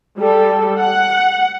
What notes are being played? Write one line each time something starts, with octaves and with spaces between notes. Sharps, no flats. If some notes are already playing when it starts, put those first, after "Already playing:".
G3 A4
F#5